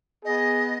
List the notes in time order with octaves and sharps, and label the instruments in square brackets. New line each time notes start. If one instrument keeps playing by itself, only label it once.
[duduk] B3 [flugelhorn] G#4 [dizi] D#5